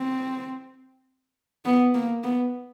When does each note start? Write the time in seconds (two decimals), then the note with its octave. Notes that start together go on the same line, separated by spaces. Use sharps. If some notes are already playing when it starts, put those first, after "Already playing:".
Already playing: C4
1.65 B3
1.94 A#3
2.23 B3